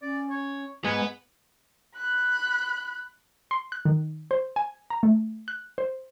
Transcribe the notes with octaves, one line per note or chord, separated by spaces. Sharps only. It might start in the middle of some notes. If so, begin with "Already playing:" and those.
C#4 D5
C#5
G#2 B3 G#5
B5 F#6
C6
F#6
D#3
C5
G#5
A#5
A3
F#6
C5